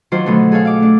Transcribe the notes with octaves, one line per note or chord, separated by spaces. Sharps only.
D#3 F#3 D4 F4 C5
B2 D3 F#3 A3 B3
G#4 A4 C#5 F5
F5 D6
A3 D4